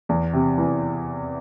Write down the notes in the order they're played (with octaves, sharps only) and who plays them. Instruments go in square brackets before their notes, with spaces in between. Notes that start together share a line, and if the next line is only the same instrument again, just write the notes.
[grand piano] E2
C3
E3